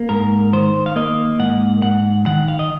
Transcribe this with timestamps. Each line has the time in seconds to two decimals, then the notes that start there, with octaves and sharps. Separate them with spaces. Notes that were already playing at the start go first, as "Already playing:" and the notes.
Already playing: A#3
0.09 G#2 A#4
0.53 D#3 C5
0.86 F5
0.96 A#3 D#5
1.39 G#2 F#5
1.82 G#2 F#5
2.26 D#3 F#5
2.48 F5
2.59 D#5